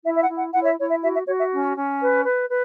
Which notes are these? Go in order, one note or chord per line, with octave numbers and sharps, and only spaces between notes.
E4 E5
E5
F#5
E4
F#5
E4 F#5
C#5
E5
E4 C#5
E5
F#4 E5
E5
F#4 C#5
E5
C#4
C#4
B4
B4
B4